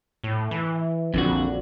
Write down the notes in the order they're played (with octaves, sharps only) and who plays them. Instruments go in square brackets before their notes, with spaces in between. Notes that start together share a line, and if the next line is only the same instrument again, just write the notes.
[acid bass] A2
E3
[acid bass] A#1 [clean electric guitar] F2 D3 F#4